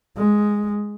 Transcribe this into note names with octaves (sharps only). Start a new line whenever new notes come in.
G#3